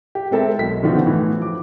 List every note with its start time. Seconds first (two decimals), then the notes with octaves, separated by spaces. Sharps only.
0.15 G4
0.31 G#3 C4 A4 A#4 E5
0.59 B1 B6
0.83 D3 D#3 F3 B3 D4 F#4
1.06 A2 E3
1.38 F3 D6